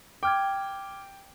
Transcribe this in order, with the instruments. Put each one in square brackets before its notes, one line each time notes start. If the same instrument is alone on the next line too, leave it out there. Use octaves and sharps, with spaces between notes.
[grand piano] G5 [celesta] D6 F6 G#6